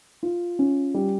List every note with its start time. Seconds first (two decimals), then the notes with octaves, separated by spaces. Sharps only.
0.23 F4
0.59 C#4
0.94 G3